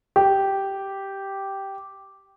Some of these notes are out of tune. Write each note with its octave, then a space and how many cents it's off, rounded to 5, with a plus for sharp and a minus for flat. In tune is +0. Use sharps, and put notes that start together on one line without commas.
G4 -5